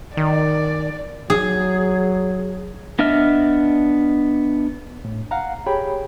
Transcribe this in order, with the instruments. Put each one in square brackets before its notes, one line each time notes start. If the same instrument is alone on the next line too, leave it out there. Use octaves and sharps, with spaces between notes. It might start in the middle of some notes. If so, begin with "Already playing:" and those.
[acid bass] D#3 [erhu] D5
[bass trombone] F#3 [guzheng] G#4
[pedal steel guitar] B3 D4 D#5 E5 F6
[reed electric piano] A2
F5 F#5 A#5
G4 G#4 C#5 G5 B5